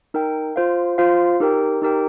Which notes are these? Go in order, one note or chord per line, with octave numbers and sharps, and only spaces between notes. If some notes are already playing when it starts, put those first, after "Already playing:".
D#4 A#4 G5
F4 C5 F5
F4 C5 F5
D#4 G4 A#4 G5
D#4 G4 A#4 G5